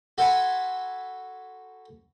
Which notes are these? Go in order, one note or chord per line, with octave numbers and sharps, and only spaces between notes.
F#4 A4 C5 F#5 G#5 B5